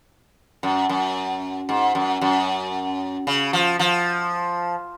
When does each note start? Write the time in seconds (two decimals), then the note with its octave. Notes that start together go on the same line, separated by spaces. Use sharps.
0.63 F#2
0.89 F#2
1.69 G#2
1.95 F#2
2.21 F#2
3.27 C#3
3.53 F3
3.79 F3